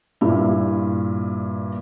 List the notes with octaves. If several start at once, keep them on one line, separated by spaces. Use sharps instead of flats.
G2 A#2 E4